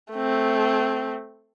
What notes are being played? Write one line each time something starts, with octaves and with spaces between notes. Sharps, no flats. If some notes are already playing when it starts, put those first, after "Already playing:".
A3 C4